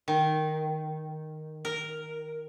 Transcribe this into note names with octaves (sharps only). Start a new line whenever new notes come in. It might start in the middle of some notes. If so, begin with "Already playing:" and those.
D#3
A#4